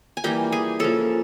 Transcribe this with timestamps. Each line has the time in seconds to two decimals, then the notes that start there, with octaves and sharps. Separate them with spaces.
0.17 G#5
0.24 E3 G3 A#3 G4 G5
0.52 G#4 G#5
0.79 C#3 F3 A#3 A4 A5